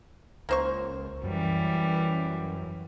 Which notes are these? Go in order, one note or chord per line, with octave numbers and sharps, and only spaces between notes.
C#2 A#3 C5 C#6
F#2 E3 G3